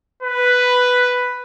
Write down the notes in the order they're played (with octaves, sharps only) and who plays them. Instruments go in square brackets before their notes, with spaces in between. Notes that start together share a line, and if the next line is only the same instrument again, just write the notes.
[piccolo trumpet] B4